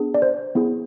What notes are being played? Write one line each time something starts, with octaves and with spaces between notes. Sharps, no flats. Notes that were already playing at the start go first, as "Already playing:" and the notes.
Already playing: B3 D4 G#4
D5
C5
B3 E4 G#4